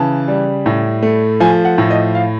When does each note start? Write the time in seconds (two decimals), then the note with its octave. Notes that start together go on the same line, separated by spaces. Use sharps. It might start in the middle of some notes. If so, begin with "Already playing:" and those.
Already playing: C#3 E3 A5
0.28 G3
0.66 A2
1.03 A3
1.40 F3 G#5
1.65 F#5
1.78 A2
1.90 D#5
2.15 F5